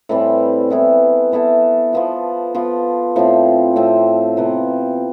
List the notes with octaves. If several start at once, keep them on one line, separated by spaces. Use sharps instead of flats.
A2 E3 G3 C4
E3 B3 E4 A4
E3 B3 E4 A4
F3 B3 F4
F3 B3 F4
A2 F3 C4
A2 F3 C4
C3 F3 B3